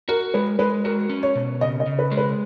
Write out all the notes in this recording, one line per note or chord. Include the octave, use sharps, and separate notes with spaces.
F#4 A#4
G#3 B4
G#3 B4
F#4 A#4
C#4
C#5
B2
C#3 D#5
D#5
C#3
B4
G#3
B4